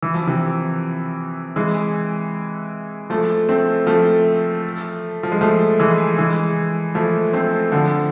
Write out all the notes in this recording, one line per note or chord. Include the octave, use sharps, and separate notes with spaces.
E3
F3
C3 E3
E3 G#3
F3 A3
A3 C4
F3 A3
F3
G#3
F3 A3
E3 G#3
E3 G#3
F3 A3
A3 C4
D3 F3